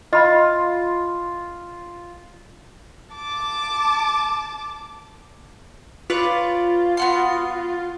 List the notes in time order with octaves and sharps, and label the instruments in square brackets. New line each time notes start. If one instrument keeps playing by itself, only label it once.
[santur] F4 [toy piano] D#5 B5
[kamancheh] A5 D6
[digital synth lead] F4 [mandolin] B4 C#5 D5
[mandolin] B3 F#4 C6